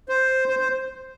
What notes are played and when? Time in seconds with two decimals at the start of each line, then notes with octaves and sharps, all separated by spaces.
0.09 C5
0.48 C5
0.59 C5